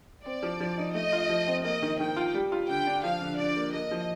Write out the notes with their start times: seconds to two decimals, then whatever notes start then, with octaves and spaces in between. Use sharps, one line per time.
0.25 C4 D5
0.43 F3
0.60 F3
0.78 D#4
0.94 A3 D#5
1.12 F4
1.29 F3
1.47 C4
1.64 A#3 D#5
1.82 D#3
2.00 D#3 G5
2.16 F4
2.34 G3
2.52 F4
2.69 D3 G5
2.87 D4
3.04 F3 F5
3.21 D3
3.38 D3 D5
3.56 A#3
3.73 A#3 D#5
3.91 F3